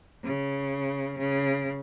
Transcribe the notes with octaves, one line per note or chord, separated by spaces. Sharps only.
C#3
C#3